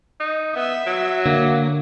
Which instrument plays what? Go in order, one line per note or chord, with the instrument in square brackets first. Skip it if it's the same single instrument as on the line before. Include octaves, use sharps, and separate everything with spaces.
[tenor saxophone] D#4
[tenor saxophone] B3 [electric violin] E5
[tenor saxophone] F#3
[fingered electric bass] D3 [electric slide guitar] A#3